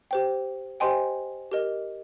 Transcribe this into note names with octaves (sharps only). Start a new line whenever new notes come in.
G4 C5 G5
G4 C5 D#5 G5 G#5 C6
G4 A#4 D#5